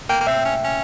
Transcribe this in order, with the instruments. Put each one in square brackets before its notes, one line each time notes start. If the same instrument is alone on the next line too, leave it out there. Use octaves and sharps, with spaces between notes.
[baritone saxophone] A#3 [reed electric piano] G5
[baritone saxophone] A#3
[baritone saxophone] C4 [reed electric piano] E5
[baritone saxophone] C#4
C#4